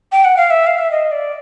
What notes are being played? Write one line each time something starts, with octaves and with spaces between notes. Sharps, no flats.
G5
F#5
F5
E5
F5
E5
D#5
D5